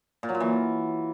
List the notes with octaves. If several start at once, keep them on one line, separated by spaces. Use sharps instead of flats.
A#2
F#3
A#2
E3